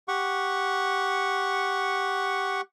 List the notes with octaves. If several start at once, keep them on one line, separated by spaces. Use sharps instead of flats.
G4 F#5 C#6